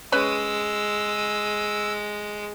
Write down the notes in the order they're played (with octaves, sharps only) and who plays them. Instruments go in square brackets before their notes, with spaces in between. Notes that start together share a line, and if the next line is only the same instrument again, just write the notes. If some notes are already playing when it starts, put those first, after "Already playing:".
[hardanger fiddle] G#3 [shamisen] C#4 B4 C#5 [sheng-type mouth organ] E6